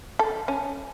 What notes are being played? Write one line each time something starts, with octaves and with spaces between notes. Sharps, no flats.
A4
C#4